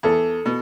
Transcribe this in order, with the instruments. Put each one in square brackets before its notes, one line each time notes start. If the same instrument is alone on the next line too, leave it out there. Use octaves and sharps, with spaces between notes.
[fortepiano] E2 [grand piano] A4
[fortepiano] B2